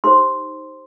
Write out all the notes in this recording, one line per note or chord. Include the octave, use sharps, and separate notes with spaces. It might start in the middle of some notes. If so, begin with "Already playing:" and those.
D#4 G4 C5 C6